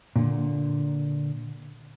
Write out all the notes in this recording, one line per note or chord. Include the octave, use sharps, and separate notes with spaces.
A#2 D3